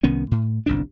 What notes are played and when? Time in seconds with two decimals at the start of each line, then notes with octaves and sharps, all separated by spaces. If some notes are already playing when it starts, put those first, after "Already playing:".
0.03 C2 D#3 B3 C#4
0.31 A2
0.66 G1 C2 G#2 D4